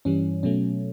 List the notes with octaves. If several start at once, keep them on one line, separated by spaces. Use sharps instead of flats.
G2 E3 G3 C#4
B2 F#3 A3 C#4